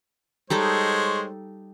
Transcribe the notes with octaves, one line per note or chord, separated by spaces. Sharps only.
G3 G#3 D#4 A4 C5 C#5